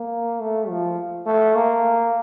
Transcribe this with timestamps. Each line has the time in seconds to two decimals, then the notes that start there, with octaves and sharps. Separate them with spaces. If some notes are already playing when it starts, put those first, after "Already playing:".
Already playing: A#3
0.40 A3
0.69 F3
1.26 A3
1.55 A#3